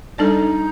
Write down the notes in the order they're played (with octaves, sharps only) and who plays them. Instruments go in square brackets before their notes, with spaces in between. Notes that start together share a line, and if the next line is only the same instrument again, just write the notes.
[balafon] G3 D4 A4 D5 [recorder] D#4